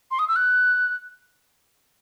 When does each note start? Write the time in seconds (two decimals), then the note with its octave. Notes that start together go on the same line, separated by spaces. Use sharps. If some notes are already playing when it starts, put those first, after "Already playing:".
0.11 C6
0.19 D#6
0.28 E6
0.36 F#6